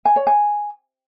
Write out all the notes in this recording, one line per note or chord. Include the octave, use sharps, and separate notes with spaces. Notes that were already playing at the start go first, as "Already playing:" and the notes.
G#5
C#5
G#5